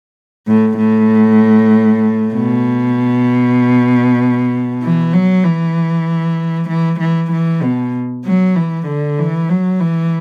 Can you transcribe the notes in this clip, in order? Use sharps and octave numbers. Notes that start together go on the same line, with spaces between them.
A2
A2
B2
E3
F#3
E3
E3
E3
E3
B2
F#3
E3
D3
E3
F#3
E3